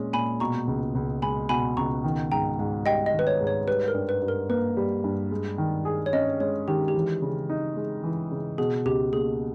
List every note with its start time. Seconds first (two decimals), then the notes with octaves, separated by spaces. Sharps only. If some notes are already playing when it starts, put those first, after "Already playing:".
Already playing: A#2 G#3 C#4 G#4
0.13 A#2 G#5 B5
0.40 B2 A#5 C#6
0.67 C#2
0.95 C#2
1.22 G#3 G#5 B5
1.49 B2 G#5 B5
1.77 C#2 A#5 C#6
2.04 D#3
2.32 G#2 G5 A#5
2.59 G#2
2.86 G3 D#5 G5
3.06 D#5
3.13 D#3
3.19 B4
3.27 C#5
3.40 G#2
3.47 C#5
3.67 G3 B4
3.88 A#4
3.94 G2
4.09 B4
4.22 G2
4.28 A#4
4.49 A#3 B4
4.77 G3
5.04 G2
5.31 G#3
5.58 D#3
5.85 G#4
6.06 C#5
6.13 C#4 D#5
6.40 G#3 C#5
6.68 D#3 G4
6.88 G4
6.95 E3
7.22 C#3
7.49 D#4
7.77 G#3
8.04 E3
8.31 C#3
8.58 B2 G#4
8.85 C#2 G4
9.13 A#3 G#4